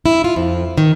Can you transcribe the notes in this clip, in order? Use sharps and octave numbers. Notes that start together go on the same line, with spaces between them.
E4
F4
F2
D#3